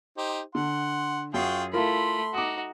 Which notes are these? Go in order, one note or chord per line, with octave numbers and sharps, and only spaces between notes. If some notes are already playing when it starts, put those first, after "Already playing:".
D#4 G4 C5
D3 F#5 C6
F#2 F4 F#4 G#4 G5 C7
A3 E4 F4 A#4 B5 C6
D#4 F#4 D6 D#6